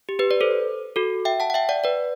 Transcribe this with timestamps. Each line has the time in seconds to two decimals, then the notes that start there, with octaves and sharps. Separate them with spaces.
0.09 G4
0.19 G4 B4
0.31 B4 D5
0.41 A4 C5
0.96 F#4 A4
1.25 E5 G5
1.40 F#5 A5
1.50 F#5
1.54 E5 G5
1.69 D5 F#5
1.84 B4 D5